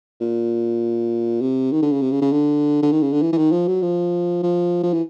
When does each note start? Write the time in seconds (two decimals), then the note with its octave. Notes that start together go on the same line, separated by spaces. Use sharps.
0.21 A#2
1.41 C3
1.72 D#3
1.82 D3
1.92 C#3
2.02 C3
2.11 C#3
2.21 C#3
2.32 D3
2.82 D3
2.92 D#3
3.02 C#3
3.12 D3
3.22 E3
3.33 E3
3.38 D#3
3.52 F3
3.68 F#3
3.82 F3
4.43 F3
4.83 F3
4.93 E3